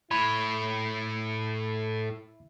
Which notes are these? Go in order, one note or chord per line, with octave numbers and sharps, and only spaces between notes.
A2 E4 C#5 B5